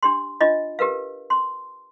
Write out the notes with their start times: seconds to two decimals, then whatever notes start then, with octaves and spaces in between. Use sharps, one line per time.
0.03 D4 G4 C6
0.41 D4 F4 D#5
0.79 G4 A#4 B4 F5
1.30 C6